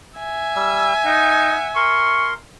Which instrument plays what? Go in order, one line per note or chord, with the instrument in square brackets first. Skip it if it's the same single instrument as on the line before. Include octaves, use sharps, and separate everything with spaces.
[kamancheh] E5 G#5
[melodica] G3 E6
[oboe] D#4 [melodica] F#5
[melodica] A#4 C6 [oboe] C#6